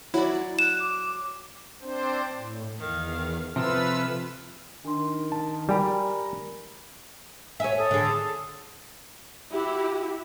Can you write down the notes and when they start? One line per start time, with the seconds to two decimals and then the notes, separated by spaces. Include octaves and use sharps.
0.14 F#3 E4 D5
0.59 F#6 E7
0.79 D6
1.81 C4 D4 C5
2.34 A2
2.78 E2 D#3 F5
3.56 C3 F3 F4 A4 B4 E6
4.85 D#3 D4 C6
5.32 A5
5.69 G3 G4 A#4 G#5 B5
7.60 C#5 E5 G#5
7.78 A4 D#6
7.91 D3 G#4
9.51 E4 F#4 G4